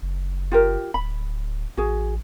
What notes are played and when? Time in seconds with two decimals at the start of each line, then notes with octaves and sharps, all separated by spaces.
0.02 F#1
0.52 F4 G4 A#4
0.94 D1 B5
1.77 A1 F#4 G#4